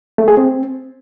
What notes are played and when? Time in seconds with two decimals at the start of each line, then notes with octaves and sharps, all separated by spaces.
0.18 A3
0.28 G#4
0.37 C4